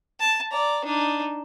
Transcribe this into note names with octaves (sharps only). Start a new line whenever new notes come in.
A5
D5 A#5
D4 D#4